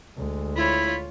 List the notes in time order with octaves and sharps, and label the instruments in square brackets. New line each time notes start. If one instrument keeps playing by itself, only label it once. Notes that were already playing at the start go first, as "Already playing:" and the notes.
[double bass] D2 G#3
[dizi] E4 [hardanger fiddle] F4 C#5 [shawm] B5